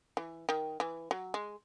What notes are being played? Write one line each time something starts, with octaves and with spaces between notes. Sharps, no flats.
E3
D#3
E3
F#3
G#3